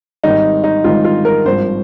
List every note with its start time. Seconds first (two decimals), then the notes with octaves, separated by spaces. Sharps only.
0.24 G#1 G#2 D#3 G3 D#4
0.64 D#4
0.84 G#1 G#2 D#3 G3 F4
1.04 F4
1.25 A#4
1.45 G#1 G2 F3 C5